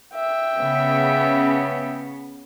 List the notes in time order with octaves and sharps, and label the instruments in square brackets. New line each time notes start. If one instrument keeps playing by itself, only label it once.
[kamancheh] E5 G5
[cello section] C#3 B3 C#4